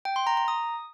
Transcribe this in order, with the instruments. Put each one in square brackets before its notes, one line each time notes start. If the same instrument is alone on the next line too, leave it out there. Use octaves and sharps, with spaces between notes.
[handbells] G5
C6
A#5
A#5
D#6